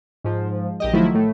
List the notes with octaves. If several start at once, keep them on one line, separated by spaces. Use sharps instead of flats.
G#2 F3
A#1 G4 D#5
D#3 F3 F#3 A3 E4
A2 A3